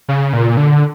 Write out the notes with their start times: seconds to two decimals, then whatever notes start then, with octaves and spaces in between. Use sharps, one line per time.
0.08 C#3
0.33 A#2
0.57 D3